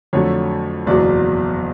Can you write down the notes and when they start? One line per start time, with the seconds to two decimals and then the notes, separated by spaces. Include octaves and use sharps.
0.13 F2 D3 F#3 A3 C#5
0.87 F#1 E2 B2 F#3 D5